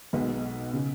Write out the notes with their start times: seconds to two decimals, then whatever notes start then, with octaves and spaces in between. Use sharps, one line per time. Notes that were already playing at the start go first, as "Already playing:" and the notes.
0.13 B1 B2 G#3 B4
0.73 C#3